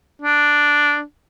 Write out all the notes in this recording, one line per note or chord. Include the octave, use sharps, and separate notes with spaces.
D4